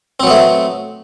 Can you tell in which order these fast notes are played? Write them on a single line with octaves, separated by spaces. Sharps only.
C4 F#3 B3 A3